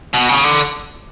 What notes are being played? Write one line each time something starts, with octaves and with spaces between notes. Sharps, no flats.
B2
C#3
D3